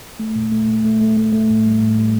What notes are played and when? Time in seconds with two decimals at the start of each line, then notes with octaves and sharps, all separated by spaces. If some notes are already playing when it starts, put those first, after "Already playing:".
0.19 A3
0.36 A#2
0.52 A3
0.68 A#2
0.84 A3
1.01 A3
1.17 A3
1.33 A3
1.50 A2
1.66 G3
1.82 A2
1.98 G3